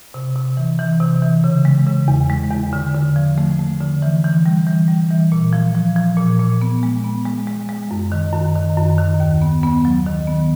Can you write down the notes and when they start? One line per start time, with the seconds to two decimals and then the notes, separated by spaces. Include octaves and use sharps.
0.14 C3
0.36 C3
0.57 E3
0.79 E3
1.00 C3
1.22 E3
1.44 C#3
1.65 G#3
1.86 C#3
2.08 E2
2.30 G#3
2.51 E2
2.73 D3
2.95 D3
3.16 F3
3.38 A3
3.59 A3
3.81 D3
4.02 E3
4.24 E3
4.46 G3
4.67 E3
4.88 G3
5.10 E3
5.32 A#2
5.53 F3
5.75 F3
5.96 F3
6.17 A#2
6.39 A#2
6.61 B3
6.83 G#3
7.04 B3
7.25 G#3
7.47 G#3
7.69 G#3
7.91 F#2
8.12 D#3
8.33 F#2
8.55 D#3
8.77 F#2
8.98 D#3
9.20 D#2
9.42 B3
9.63 B3
9.85 F#3
10.06 D#3
10.27 B3